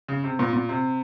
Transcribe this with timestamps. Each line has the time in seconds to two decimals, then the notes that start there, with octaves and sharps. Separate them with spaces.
0.08 C#3
0.24 C3
0.39 A#2
0.53 A#2
0.69 C3